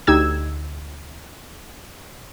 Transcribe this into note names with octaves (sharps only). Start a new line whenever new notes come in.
D2 D#4 G4 E6 G#6 E7